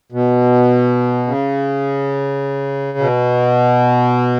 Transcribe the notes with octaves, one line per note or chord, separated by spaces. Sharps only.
B2
C#3
B2